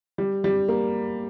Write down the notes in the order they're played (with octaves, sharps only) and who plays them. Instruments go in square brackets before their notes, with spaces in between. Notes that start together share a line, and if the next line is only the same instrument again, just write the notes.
[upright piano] G3
G3
A#3